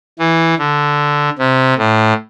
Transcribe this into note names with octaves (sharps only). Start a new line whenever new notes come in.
E3
D3
C3
A2